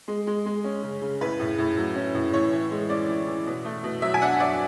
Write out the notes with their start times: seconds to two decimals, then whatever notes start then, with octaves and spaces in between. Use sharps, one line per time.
0.08 G#3
0.27 G#3
0.46 G#3
0.64 C#4
0.83 C#3
1.02 C#3
1.21 A2 B4
1.40 A2
1.58 A2
1.77 F#3
1.96 C#4
2.15 A2
2.34 E3 C#5
2.52 E3
2.71 G#3
2.89 C#4 D5
3.09 E3
3.27 E3
3.46 B2
3.65 A3
3.83 B2
4.02 F#3 E5
4.14 G#5
4.22 D4 F#5
4.40 F#3 D5